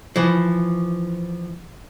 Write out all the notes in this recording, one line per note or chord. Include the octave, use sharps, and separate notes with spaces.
E3 F3